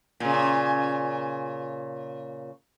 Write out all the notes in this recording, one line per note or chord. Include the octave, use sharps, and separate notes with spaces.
A#2 C#3